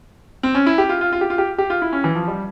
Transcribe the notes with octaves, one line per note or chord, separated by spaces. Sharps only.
C4
C#4
E4
G4
F4
F4
F4
G4
F4
G4
G4
F4
E4
C#4
E3
F3
G3